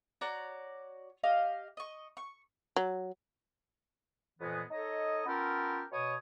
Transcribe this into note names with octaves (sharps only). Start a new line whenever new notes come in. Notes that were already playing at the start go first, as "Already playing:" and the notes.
F#4 C#5 D5 A#5
G4 D#5 F5
D#5 C#6
C#6
F#3
F2 A#2 E3 G#3 B3
D#4 A4 C#5 D#5
B3 C#4 F4 G4 A4 A#4
B2 C#5 D#6